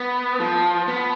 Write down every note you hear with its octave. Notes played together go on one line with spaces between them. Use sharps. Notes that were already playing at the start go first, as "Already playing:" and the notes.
Already playing: B3
F3
B3